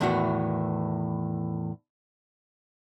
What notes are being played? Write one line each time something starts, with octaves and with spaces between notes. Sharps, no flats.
E2 A2 D#3 E3 F#4